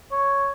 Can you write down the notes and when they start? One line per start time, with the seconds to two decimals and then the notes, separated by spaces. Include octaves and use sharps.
0.12 C#5